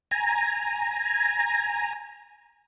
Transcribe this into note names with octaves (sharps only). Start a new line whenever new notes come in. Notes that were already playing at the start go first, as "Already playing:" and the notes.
G#5 A#5